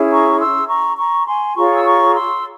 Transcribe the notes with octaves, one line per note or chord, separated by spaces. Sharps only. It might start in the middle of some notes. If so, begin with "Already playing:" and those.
Already playing: C#4 E4 G#4
A#5 C#6
C6 E6
A#5 C#6
A#5 C#6
G#5 C6
F4 G#4 C#5 A#5 C#6
E6
A#5 C#6
C6 E6